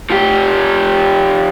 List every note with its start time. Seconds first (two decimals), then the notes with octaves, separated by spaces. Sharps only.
0.10 F3 G4